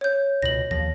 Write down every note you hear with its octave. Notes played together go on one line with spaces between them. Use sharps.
C#5 G6
C#2 B2 A#6 F#7
D#2 F3 A#6